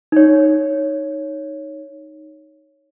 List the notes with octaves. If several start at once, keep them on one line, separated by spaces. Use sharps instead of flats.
D#4 C#5